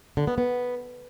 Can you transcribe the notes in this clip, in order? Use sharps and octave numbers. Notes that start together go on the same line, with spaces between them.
D3
B3
B3